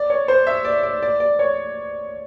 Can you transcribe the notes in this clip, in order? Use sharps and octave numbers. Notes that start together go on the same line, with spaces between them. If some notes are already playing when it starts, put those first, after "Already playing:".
Already playing: D5
C#5
C5
E5
D5
D5
D5
D5
C#5